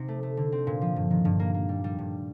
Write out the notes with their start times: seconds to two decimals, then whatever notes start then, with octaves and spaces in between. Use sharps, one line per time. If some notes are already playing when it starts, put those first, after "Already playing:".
Already playing: C3 D#4
0.08 A3
0.23 A3
0.37 D3
0.52 C4
0.67 A#2
0.81 F3
0.96 G2
1.11 D#3
1.25 G2
1.40 A#3
1.54 A#3
1.69 G3
1.84 G3
1.99 G2